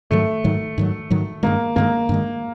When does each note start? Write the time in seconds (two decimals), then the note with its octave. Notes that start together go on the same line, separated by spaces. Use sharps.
0.11 G#2 D#3 F#3 A3
0.44 G#2 D#3 F#3
0.78 G#2 D#3 F#3
1.10 G#2 D#3 F#3
1.43 G2 D#3 G#3 A#3
1.76 G2 D#3 G#3 A#3
2.09 G2 D#3 G#3